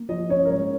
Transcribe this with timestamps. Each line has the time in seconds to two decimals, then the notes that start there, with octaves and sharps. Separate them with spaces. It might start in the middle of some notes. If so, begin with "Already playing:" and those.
Already playing: A#3
0.09 F3 D#5
0.29 C#4 C#5
0.45 A#4
0.49 G#2 C#5